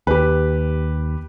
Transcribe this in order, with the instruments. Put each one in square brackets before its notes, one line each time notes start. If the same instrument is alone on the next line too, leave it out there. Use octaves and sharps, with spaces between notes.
[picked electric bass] D#2 [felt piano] G4 B4